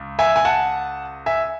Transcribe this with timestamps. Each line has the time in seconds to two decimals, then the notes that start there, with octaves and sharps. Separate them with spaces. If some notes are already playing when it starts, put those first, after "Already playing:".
Already playing: C#2
0.19 E5 G#5
0.36 G#5
0.45 F#5 A5
1.26 E5 G#5